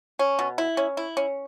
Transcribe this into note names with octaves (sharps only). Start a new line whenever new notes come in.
C#4
B2
E4
C#4
E4
C#4